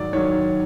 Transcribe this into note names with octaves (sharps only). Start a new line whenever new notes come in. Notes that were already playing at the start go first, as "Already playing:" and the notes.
Already playing: G#2 D#3 F#3 D5
G#2 D#3 F#3 C#5